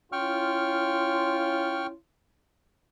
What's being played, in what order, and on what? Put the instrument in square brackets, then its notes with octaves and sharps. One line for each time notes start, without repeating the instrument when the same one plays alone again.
[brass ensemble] C#4 E4 F4 [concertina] G5 C#6 F6